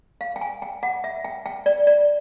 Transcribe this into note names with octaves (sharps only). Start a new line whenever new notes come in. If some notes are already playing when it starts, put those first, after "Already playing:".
F5
G5
G#5
G5
F#5
E5
G5
G5
D5
D5